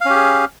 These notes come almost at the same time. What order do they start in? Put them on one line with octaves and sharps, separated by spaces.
F5 C#4 G4 G#4